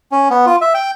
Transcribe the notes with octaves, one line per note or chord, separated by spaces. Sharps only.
C#4
B3
F4
E5
G5